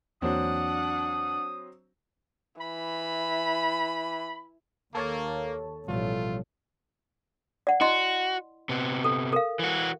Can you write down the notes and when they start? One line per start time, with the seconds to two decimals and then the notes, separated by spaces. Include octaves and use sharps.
0.22 E2 E3 F#3 A#3 C4 D4 F#5 D#6
2.61 E3 B5
4.95 D#2 A#3 A4 C#5 A5
5.88 A1 B2 F3 G3 A3 F4
7.67 D5 F#5
7.81 E4 F#4 D#5 C6
8.69 C3 B3
9.04 A4
9.33 A4 A#4 F5
9.59 E3 F#4